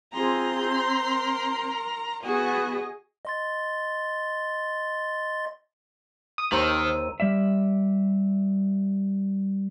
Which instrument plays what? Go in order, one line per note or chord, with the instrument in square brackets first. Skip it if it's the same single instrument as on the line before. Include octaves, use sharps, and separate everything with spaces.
[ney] C4 [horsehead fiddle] F4 G#4 [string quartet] A#5 C6
[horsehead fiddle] A#4
[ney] B3 [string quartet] F#4 [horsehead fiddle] G#4 D#5
[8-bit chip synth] D#5 C6 A6
[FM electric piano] D#6
[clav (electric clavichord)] D#2 [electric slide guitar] D#3 [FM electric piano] C5 [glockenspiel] A#5 E6 D#7
[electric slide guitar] G3 D5 E5